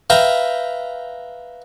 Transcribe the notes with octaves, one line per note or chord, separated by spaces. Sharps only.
B4 E5 F5 G5 A#5